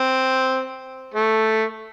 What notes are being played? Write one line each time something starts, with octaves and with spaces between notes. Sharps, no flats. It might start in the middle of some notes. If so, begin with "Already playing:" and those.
Already playing: C4
A3